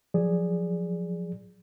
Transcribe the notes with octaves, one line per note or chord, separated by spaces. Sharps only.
F3 F#3 G#4 D5